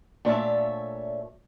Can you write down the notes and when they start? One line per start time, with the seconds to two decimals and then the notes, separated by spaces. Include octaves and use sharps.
0.25 A#2 A3 D4 C#5 E5 A5